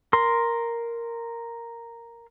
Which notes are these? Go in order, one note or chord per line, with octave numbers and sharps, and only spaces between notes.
A#4 C6